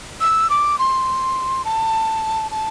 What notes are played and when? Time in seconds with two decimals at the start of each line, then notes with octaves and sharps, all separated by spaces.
0.21 E6
0.50 D6
0.79 C6
1.65 A5
2.51 A5